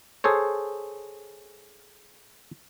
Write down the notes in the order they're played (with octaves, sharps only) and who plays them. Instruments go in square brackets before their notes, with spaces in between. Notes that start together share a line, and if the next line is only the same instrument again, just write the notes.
[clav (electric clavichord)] G#4 A4 C5 C#5